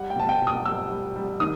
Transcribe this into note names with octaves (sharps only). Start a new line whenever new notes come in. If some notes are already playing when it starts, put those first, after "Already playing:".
Already playing: G3 F#5
G5
B2 A5
G5
B2
D#6
G3 E6
G3
G3
D#3 D#6